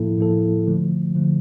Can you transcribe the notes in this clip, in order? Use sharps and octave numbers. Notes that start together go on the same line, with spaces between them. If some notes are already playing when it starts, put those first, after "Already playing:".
Already playing: A2 F3 A#3 E4 A4
A2 F3 A#3 E4 A4
D3 F3 A3
D3 F3 A3